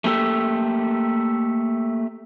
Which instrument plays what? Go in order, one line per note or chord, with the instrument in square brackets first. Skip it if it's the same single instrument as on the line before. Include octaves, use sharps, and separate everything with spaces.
[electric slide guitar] A3 A#3 G4 A4